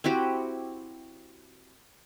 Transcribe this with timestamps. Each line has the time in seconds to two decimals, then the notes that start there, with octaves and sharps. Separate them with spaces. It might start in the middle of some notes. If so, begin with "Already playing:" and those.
0.04 C4 E4 F#4 G4